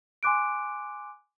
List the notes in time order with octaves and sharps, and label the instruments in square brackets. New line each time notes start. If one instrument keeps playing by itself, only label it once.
[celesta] G#5 C6 D6 F#6 D7